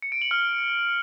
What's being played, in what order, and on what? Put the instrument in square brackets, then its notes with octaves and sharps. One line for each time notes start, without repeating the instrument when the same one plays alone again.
[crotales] C#7
D7
F#7
F6